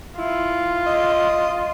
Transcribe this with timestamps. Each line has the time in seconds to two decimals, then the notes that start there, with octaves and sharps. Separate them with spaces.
0.18 E4 F4
0.86 D#5